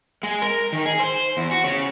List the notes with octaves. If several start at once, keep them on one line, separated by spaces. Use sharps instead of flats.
G#3
A#4
D#3
G#4
C5
E2
F#4
C#3